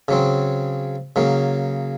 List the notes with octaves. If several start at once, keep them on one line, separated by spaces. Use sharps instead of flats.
C#3 F#3 C4
C#3 F#3 A#3